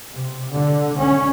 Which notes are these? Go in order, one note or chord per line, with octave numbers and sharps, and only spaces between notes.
C3
D3
C#4